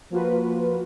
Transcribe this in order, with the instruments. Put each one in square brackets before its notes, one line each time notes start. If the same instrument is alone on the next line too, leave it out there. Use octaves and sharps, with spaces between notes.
[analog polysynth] F3 A#3 F4 F#4 B4